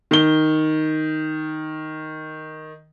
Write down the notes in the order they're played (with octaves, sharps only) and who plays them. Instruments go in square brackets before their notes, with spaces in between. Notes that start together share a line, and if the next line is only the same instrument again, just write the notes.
[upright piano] D#3 G7